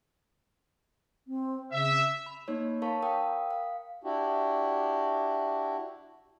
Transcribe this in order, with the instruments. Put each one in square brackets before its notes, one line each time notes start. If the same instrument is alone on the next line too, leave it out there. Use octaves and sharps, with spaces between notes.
[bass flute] C4
[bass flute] C#3 [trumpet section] E5
[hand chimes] B5
A#3 D#4 C#5
A#4 C#5 F5 A5 B5 C#6
A#4 F5 G5 D#6
F5
[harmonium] D4 E4 F#4 G4